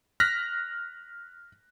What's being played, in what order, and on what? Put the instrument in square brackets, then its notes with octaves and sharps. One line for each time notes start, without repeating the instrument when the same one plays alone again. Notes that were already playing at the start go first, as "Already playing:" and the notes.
[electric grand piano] F6 F#6 A#6 B6